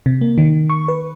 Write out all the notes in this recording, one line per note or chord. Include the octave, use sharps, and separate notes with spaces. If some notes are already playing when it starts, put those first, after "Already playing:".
C3
A#3
D#3
C#6
B4